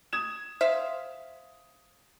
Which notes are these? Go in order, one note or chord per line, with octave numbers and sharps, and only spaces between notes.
D#6 G#6 E7
C5 E5 F5